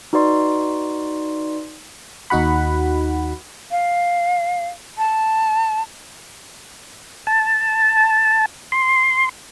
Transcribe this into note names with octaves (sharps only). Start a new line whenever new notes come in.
D#4 F#4 B4 D5 C6
D#2 D#4 F#4 F#5 B5
F5
A5
A5
C6